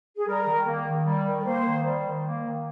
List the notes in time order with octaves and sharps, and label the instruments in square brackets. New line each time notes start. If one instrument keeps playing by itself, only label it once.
[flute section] G#4
[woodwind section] G3 [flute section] A#4
[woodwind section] D#3
A#3
D#3
G3
D#3
[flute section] A#4
[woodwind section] A#3 [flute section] C5
[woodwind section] D#3
G3
D#3
A#3
D#3